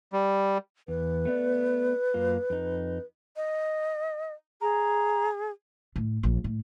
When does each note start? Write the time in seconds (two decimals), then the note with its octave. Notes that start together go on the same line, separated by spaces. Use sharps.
0.13 G3
0.88 E2 B4
1.25 A3 B3 D5
2.14 F#2 A#3 F4
2.50 F2 D#4
3.36 D#5
4.61 G#4 A#5
5.96 A2
6.23 A#1
6.44 A2